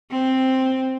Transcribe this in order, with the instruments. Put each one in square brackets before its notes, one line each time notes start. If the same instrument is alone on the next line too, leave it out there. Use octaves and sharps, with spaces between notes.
[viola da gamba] C4